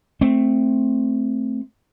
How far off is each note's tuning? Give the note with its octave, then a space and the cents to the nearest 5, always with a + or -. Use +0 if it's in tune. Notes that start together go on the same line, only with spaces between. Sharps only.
A3 +0 C4 +0